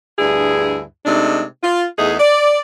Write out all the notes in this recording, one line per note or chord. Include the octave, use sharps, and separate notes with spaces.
D2 G2 E4 G#4
C3 G#3 A3 D4 D#4
F4
E2 A3 D#4 G#4
D5